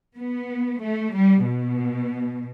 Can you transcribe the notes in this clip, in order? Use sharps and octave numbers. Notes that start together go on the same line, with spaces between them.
B3
A3
G3
B2